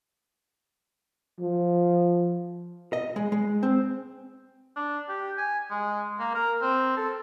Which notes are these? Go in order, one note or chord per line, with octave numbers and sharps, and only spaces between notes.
F3
D#5
G#3
G#3
C4
D4
G4
G#5
G#3
A#3
A#4
C4
A4